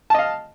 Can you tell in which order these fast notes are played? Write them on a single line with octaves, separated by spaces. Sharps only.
A5 D#5 F5